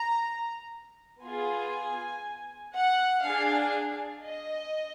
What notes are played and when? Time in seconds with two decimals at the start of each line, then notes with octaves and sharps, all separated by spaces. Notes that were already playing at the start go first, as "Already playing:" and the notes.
Already playing: A#5
1.23 B3 F4 G#4 G#5
2.74 F#5
3.24 D4 G#4 F5
4.24 D#5